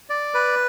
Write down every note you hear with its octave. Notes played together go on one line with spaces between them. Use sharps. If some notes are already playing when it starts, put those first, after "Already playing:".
D5
B4